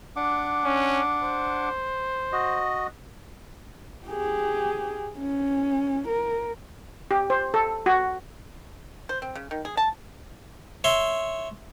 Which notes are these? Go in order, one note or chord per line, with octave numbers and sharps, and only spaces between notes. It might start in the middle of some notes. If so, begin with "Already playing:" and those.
D4 F#5 D6
C#4
C5
F#4 D#5
G4 G#4
C#4
A#4
G4
C5
A4
F#4
C5
C4
C#3
D#3
G#4
A5
C#5 E5 C6